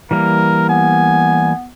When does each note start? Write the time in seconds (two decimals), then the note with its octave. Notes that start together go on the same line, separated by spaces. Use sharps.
0.11 E3 G3 A#3 A#4
0.69 B3 G#5